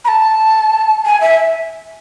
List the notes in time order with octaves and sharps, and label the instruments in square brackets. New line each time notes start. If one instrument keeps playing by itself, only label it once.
[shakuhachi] B5
A5
G#5
E5